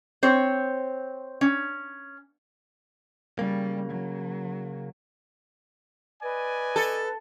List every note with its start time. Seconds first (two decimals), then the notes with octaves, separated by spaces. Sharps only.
0.23 C4 C5 C#5
1.41 C#4
3.39 C#3 G3 A#3
3.90 F#3
6.23 B4 D5 D#5 G#5
6.76 A4